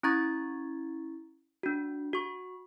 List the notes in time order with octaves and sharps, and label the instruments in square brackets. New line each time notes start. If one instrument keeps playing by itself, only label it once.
[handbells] C#4 E4 A#5 C#6 G#6 A6
D4 F#4
F#4 C#6